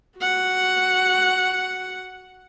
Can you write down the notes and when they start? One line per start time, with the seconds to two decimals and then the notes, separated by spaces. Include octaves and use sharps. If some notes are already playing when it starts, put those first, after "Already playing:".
0.19 F#4 F#5